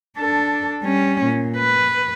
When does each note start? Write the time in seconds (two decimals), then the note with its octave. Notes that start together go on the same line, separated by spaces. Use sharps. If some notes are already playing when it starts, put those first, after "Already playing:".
0.18 D4 A4
0.83 G3 C#4
1.25 A#2
1.57 B4